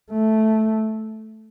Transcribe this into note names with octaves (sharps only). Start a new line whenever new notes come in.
A3